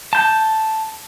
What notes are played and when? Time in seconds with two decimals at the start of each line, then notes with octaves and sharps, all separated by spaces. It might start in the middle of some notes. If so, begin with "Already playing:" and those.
0.13 A5 G6